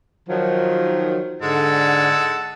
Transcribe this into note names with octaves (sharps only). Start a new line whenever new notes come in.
D#3 F3 F#3
G#2 D3 G#3 A4 F#5